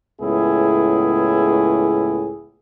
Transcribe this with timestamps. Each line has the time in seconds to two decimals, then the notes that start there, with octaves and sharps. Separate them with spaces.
0.21 C#2 A2 B3 E4 G#4